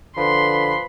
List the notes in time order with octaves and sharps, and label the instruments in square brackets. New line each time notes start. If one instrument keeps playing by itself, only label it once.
[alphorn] D3 [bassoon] F3 [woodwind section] B4 B5 [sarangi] C6